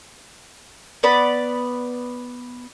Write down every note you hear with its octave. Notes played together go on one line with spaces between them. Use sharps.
B3 D5 B5